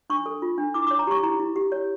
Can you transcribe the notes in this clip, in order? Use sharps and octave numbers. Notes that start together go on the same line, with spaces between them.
D4 C#6
A4
F4
D4
E4 D6
D6
C#5
A#5
G4 C#6
E4 A#5
E4
G4
C#5